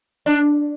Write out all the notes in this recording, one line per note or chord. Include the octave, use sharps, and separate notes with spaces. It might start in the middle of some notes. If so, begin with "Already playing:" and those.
D4